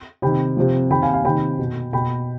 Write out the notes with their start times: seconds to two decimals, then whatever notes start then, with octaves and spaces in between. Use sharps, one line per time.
0.22 C3 D#3 G5 B5
0.57 C3 F3
0.90 C3 D#3 G5 B5
1.02 F5 G#5
1.13 F5 G#5
1.25 C3 D#3 G5 B5
1.59 B2
1.93 B2 G5 B5